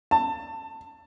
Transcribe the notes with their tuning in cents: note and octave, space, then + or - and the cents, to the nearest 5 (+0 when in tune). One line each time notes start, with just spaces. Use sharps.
A5 +20